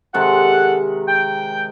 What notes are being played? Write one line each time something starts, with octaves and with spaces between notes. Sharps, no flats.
C3 D#3 G#3 A4 F#5
G5